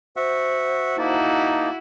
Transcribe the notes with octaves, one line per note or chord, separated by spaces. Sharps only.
F#4 C5 E5 F#5
A#3 D#4 E4 F#4 A5